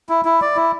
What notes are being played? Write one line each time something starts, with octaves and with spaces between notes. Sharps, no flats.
E4
E4
D5
E4